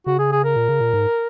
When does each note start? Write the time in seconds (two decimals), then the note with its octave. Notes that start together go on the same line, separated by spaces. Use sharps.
0.06 C#3 F#4
0.19 G#4
0.32 G#4
0.44 A#4
0.56 A#2
0.68 C#3
0.81 A#2
0.94 G#2